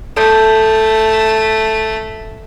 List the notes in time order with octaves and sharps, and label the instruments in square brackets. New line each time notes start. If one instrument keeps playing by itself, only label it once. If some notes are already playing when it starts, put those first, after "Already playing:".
[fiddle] A3 [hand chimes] A4 A5 G6